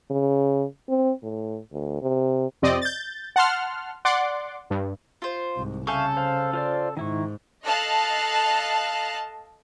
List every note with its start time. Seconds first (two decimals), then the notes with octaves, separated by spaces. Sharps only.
0.10 C#3
0.89 C4
1.22 A2
1.72 D2
2.02 C3
2.62 F2 C3 C4 D5 D#5
2.82 G6 A6
3.36 F#5 A5 C6 F6
4.05 D5 F#5 C6 D6
4.70 G2
5.22 F4 C5
5.56 C2 G#2
5.87 C#3 A4 E5 F5 G#5 C#6 G6
6.17 C5 F5
6.53 F4 C5 D5
6.97 G#2 D#3 E4 C#6
7.63 A4 D#5 F5 A5 F6 F#6